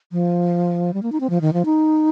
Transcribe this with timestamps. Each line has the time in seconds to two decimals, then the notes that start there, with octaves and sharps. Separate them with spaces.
0.12 F3
0.94 G3
1.03 A#3
1.12 D#4
1.20 C4
1.30 F3
1.41 D#3
1.53 F3
1.65 D#4